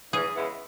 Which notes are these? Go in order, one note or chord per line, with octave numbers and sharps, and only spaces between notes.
E2 G#4
C#3 G#3 B3 E4